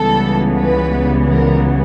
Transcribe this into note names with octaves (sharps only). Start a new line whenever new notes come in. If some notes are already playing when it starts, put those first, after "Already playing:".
Already playing: C#2 C#3 E3 G3 B3 A4
B4
A#4